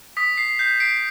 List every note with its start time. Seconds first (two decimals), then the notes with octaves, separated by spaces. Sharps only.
0.17 D#6 B6
0.37 C7
0.59 G6 C7
0.80 C7 D7